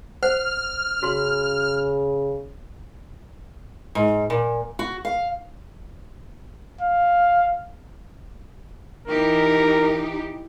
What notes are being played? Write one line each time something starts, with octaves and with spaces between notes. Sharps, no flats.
C5 F#5 F6
C#3 F#4 C6
G#2
A#2
F#4
F5
F5
E3 D#4 G4 A#4